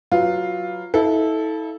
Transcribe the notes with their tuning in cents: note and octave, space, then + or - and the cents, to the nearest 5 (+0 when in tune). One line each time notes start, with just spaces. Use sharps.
F#3 +0 F4 +0 B4 +0
E4 -40 A4 -10 F5 -30